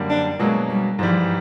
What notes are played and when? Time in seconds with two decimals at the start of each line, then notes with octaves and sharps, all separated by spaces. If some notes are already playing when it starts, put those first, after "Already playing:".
Already playing: F#2 D3 G3 A#3
0.10 D4
0.39 B2 F#3 G#3 A#3
0.69 G3
0.99 G#2 E3 F3 G3